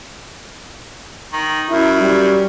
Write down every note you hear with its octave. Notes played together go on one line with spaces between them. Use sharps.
D#3
F#2 E4
G3